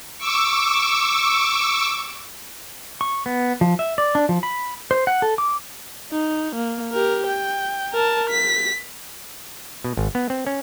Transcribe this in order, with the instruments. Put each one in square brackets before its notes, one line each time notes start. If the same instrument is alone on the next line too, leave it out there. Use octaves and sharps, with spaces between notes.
[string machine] C#6 D6 E6
[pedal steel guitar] C#6
B3
F3
E5
D5
D4
F3
B5
C5
F#5
A4
D6
[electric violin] D#4
A#3
G4 A#4
G5
A#4 A5
B6
[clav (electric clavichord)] B2
G#1
B3
C4
C#4